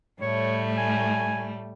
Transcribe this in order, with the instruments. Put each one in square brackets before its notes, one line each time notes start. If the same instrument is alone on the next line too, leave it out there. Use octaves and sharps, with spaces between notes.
[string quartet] A2 G3 A3 [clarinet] C#5
[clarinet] G#5